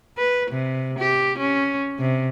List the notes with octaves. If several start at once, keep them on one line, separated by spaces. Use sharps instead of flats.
B4
C3
G4
C#4
C3